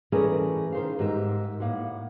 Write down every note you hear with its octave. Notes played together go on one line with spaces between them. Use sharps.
E3 A3 C#4 G#4 A#4 D5
D#3 C5 F5
G#2 G4 A#4 E5
A2 A#3 F#5